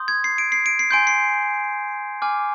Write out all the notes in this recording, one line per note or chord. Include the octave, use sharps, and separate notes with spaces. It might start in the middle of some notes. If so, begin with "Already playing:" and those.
Already playing: C6 D#6 G6
G#6
C7
D7
C7
D7
C7
G#5 C6 G6 D7
C7
G#5 D6 F6